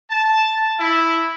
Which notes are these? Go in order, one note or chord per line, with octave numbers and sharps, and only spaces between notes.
A5
E4